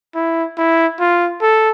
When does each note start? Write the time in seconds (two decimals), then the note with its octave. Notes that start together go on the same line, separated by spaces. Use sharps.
0.15 E4
0.58 E4
1.00 F4
1.41 A4